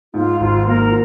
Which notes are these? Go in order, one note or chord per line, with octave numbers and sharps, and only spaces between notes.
G#2 F4
G#1 F4
A#3 A#4
F4